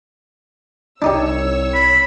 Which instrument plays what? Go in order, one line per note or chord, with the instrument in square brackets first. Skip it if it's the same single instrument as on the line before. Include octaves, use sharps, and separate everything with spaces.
[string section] C2 C#5 E6 [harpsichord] D4 D#4 G4
[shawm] B5